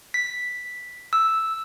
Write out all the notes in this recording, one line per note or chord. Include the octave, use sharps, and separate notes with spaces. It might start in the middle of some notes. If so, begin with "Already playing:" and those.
B6
E6